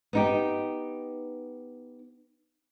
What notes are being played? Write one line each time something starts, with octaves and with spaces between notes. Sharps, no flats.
B3 D#4 G4